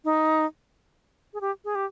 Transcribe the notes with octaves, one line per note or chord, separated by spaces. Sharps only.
D#4
G#4
G4
G#4
G4